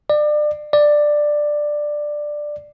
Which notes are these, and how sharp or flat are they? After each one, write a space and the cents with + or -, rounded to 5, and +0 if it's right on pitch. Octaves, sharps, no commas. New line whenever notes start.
D5 +30
D5 +10